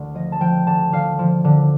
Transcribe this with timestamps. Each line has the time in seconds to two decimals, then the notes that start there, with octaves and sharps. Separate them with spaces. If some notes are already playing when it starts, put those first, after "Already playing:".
Already playing: D2 D3
0.14 F3 D#5
0.32 A5
0.40 F3 G5
0.66 D3 A5
0.92 D3 F5
1.19 F3
1.44 D3